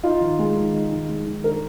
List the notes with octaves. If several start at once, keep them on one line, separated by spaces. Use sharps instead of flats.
D#4 F4
D#3
G#3
D#3
D#4
D#3
G#3
D#3
D4 A#4